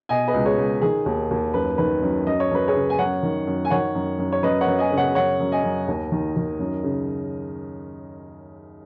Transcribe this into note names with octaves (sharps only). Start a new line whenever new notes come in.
B2 D#5 G#5
B4 D#5
C#2
G#4 C#5
C#2
D#3 G#4
D#2
D#2
F#2 B4
D#3 B4
F#2
F#2 D#5
C#5
F#2 B4
G#4 C#5
C#3
G#5
F#2 C#5 F#5
D#3
F#2
G#5
D#3 C#5 F#5
F#2
F#2
C#5
F#2 B4 D#5
C#5 F#5
F#2
D#5 G#5
C#3
C#5 F#5
F#2 C#5 F#5
F#2
D#5 G#5
F#2
D#2
D#3
D#3
F#2
C#3